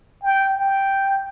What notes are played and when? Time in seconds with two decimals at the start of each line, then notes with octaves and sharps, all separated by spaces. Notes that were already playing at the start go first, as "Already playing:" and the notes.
0.23 G5
0.57 G5